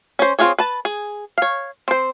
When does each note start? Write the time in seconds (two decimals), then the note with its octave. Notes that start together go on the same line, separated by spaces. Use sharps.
0.19 C#4 C5
0.39 C4 E4 F4 G#4 C#5
0.59 B4 A5
0.85 G#4
1.38 C#5 F5
1.88 C4 C5